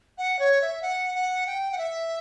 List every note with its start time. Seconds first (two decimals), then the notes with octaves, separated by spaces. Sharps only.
0.18 F#5
0.39 C#5
0.61 E5
0.82 F#5
1.14 F#5
1.46 G5
1.71 F#5
1.78 E5